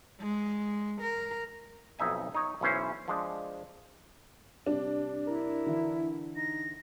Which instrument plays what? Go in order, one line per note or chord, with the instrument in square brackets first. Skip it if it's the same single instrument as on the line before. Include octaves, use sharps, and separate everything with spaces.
[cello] G#3
A#4
[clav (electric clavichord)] B1 F2 D#4 E5 G#5
D#4 C#5
B1 E3 C#4 C5
F3 G#3 D4
[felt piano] C3 G3 [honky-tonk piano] D4
[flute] E4 [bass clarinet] A#4
[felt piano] D3 E3
[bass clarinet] D#4 [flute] A#6